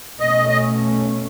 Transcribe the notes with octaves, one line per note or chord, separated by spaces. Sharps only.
B2 A3 C#4 D#5
D#5